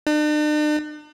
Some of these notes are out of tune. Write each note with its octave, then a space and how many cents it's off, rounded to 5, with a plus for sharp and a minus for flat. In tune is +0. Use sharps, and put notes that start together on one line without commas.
D4 +45